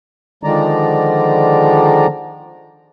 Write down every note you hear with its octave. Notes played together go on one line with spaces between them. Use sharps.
D3 D#3 F3 G#3 D5 A#5